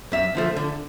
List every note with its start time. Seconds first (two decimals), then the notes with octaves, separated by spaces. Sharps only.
0.12 F#2 E5
0.35 D3 F3 A3
0.56 D3